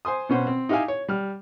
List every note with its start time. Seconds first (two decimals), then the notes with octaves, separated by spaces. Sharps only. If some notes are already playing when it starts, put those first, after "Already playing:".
0.05 C5 G#5 C6 D#6
0.29 B2 C#4 C5 F#5
0.47 C4
0.69 D#4 E4 G4 E5 F5 G#5
0.88 C#5
1.08 G3 F6